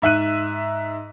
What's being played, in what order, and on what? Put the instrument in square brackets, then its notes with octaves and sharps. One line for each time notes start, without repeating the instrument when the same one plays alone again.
[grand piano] G#2 E5 F#6 D#7